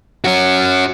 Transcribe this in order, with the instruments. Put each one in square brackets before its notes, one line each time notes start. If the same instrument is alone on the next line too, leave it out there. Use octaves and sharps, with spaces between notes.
[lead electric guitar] C#4 F#4